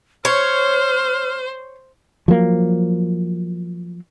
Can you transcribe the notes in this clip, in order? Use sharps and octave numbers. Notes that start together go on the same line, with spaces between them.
C5 C#5 F6
F3 F#3 A#3